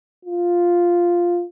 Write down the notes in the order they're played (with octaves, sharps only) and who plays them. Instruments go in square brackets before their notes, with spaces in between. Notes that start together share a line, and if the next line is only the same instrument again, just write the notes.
[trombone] F4